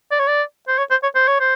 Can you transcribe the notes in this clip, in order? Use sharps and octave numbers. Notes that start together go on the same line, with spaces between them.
D5
C#5
D5
C5
C#5
C5
C#5
C5
C#5
C5